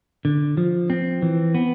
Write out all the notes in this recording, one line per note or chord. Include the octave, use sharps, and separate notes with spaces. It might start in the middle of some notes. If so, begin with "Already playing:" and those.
D3
F3
C4
E3
B3